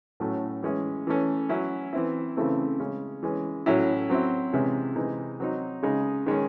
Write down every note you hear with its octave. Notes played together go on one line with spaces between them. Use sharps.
A2 F#3 A3 C#4
E3 G#3 C#4 E4
E3 A3 C#4
F#3 C#4 E4
E3 C4 E4
C#3 E3 A3 C4 E4
C#3 G#3 C#4
E3 G#3 C#4
A2 F#3 C#4 E4
F#3 C4 E4
C3 E3 G#3 C#4 E4
C3 E3 G#3 D#4
F#3 C4 D#4
C#3 G#3 D#4
D#3 G#3 C#4